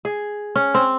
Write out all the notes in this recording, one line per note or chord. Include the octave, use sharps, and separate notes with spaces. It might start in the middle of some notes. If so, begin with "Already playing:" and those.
G#4
C#4
C4